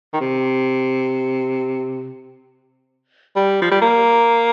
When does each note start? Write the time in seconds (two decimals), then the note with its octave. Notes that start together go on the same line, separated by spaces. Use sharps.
0.13 D#3
0.21 C3
3.36 G3
3.62 F3
3.71 G3
3.82 A#3